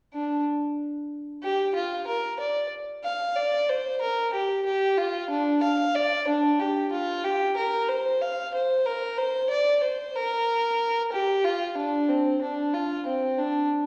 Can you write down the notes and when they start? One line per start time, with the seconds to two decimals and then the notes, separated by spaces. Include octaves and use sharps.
0.13 D4
1.43 G4
1.75 F4
2.07 A#4
2.40 D5
3.05 F5
3.37 D5
3.69 C5
4.02 A#4
4.33 G4
4.66 G4
4.98 F4
5.30 D4
5.63 F5
5.95 D5
6.28 D4
6.60 G4
6.92 F4
7.24 G4
7.57 A#4
7.89 C5
8.21 F5
8.54 C5
8.86 A#4
9.18 C5
9.50 D5
9.84 C5
10.15 A#4
11.13 G4
11.44 F4
11.77 D4
12.09 C4
12.41 D4
12.74 F4
13.07 C4
13.38 D4